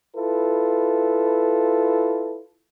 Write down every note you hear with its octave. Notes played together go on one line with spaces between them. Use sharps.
E4 F4 A4 B4